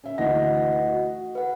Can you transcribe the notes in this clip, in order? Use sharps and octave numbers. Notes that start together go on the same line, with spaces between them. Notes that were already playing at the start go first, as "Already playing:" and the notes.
C#4 E5
D2 E3 D#5 F#5 A#6
F#4
B4 F#5